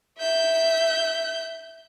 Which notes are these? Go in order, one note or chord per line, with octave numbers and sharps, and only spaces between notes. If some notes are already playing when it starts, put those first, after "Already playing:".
E5 G6